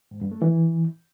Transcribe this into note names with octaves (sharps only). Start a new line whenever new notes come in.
G#2
G2
A3
E3